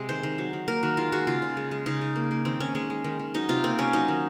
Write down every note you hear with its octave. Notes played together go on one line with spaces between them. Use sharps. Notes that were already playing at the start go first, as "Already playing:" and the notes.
Already playing: C3 G#3
D#3 C5
D#3
F#3
D#3
A#3 A#4
D#3 F#4
G#3 F4
G#3 F#4
C#3 F4
C#3
G#3
G#3
C#3 D#4
C#3
A#3
A#3
D#3 C4
D#3 C#4
G#3 C#4
G#3
D#3
D#3
F#3 D#4
C3 F4
A#3 C4
C3 C#4
F#3 D#4
D#3